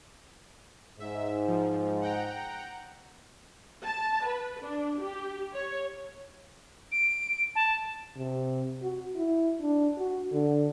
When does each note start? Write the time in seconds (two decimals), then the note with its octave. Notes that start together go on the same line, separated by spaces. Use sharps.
1.00 G#2 E5
1.48 F3
2.02 F#5 G5 A#5
3.84 A5
4.27 B4
4.62 D4
5.01 G4
5.54 C#5
6.92 D7
7.55 A5
8.17 C3
8.83 F#4
9.16 E4
9.62 D4
9.98 F#4
10.32 D3